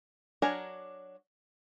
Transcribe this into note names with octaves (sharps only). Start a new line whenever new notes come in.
F#3 D4 A#4 G#5 A#5